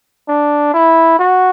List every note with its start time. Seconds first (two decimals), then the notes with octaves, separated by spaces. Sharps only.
0.28 D4
0.74 E4
1.19 F#4